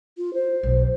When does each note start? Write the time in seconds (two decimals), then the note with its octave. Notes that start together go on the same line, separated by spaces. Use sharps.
0.18 F4
0.34 C5
0.63 B1